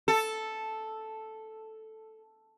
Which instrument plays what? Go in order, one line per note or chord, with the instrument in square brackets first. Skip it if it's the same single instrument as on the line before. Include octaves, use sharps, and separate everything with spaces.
[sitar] A4